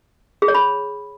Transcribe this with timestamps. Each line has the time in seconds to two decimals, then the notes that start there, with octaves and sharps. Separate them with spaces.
0.42 G#4
0.48 C#5
0.55 B5